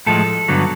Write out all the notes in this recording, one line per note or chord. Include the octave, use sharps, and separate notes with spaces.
A2 F3 G#3 A4
G2 D3 F#3 B3